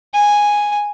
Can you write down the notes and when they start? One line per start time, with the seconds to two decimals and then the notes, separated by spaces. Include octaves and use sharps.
0.14 G#5